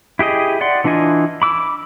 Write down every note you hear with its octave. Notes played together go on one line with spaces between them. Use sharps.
E4 G4 G#4 D#5
D5 F#5 C6
E3 D4 F4 D#5 G#5
B5 D6 E6